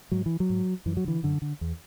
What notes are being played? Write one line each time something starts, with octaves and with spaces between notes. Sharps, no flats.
G#2 F#3
E3
F#3
G#2
F#2 E3
F#3
D3 E3
F#2 D3
D3
E2